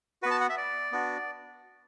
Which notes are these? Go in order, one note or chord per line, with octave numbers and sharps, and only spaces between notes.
B3 F#4 B4
A5
F#5
E5
D5
B3 D4 F#4